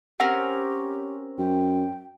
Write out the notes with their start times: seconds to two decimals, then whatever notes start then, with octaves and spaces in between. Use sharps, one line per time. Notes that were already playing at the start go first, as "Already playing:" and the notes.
0.20 C4 C#4 G4 A#4 F#5
1.39 F#2 G5